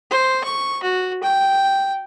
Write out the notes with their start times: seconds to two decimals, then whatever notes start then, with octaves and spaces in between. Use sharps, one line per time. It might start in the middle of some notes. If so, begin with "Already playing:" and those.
0.10 C5
0.43 C#6
0.83 F#4
1.23 G5